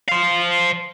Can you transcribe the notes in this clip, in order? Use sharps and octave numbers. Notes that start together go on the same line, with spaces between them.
C5 F5